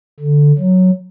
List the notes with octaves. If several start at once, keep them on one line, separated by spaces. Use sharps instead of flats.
D3
F#3